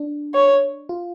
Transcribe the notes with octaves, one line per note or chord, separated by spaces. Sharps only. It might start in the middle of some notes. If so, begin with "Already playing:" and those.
Already playing: D4
C#5
F4